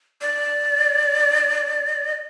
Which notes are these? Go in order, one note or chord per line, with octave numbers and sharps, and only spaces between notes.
D5